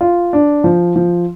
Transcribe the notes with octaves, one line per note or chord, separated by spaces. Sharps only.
F4
D4
F3
F3